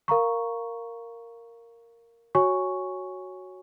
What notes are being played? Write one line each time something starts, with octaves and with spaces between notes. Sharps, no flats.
A#4 F5 A#5 C#6
F#4 C#5 G#5 C#6